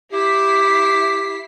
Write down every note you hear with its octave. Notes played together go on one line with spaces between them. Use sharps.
E4 G4 B6 C7